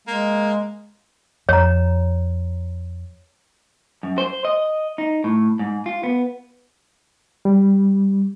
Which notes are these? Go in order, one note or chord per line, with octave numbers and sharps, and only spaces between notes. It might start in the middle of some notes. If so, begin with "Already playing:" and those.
G#3 A#3
F2 C#5 A#5
F#2
C5
D#5
D#4
A2
G#2
F4
B3
G3